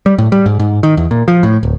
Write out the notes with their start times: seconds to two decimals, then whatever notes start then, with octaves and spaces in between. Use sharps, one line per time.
0.06 G3
0.18 A2
0.32 G3
0.46 G#2
0.59 G#2
0.83 D#3
0.97 E2
1.11 A#2
1.28 F3
1.43 A2
1.63 D1